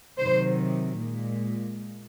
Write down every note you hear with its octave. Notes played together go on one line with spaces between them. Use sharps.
C3 D#3 F#3 C5
A#2 G#3